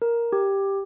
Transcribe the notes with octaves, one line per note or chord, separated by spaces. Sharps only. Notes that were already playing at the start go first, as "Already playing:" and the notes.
A#4
G4